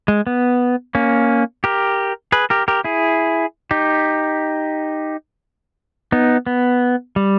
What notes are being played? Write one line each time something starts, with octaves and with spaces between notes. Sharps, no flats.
G#3
B3
A#3 C#4
G4 A#4
G#4 B4
G4 A#4
G4 A#4
E4 G#4
D#4 G4
B3 D#4
B3
G3